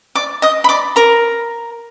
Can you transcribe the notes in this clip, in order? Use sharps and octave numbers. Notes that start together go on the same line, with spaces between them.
D5 D6
D#5 D#6
B5
D5 D6
A#4 A#5